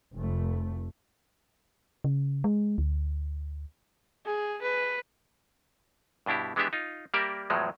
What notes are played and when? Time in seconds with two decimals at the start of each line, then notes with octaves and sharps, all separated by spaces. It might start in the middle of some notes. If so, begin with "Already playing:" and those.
0.13 F1 A3
2.04 C#3
2.44 G#3
2.78 D2
4.26 G#4
4.62 B4
6.26 G2 B2 D4 E4 G4
6.56 E3 G#3 B3 D4 G4 E5
6.73 D#4 F4
7.14 G3 A#3 G4 A#4 D5 E5
7.50 E2 A2 F3 F#3 G#3